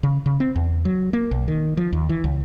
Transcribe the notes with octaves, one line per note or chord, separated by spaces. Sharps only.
C#3
C#3
C4
E2
F#3
A#3
B1
D#3
F3
D#2
E3
C#2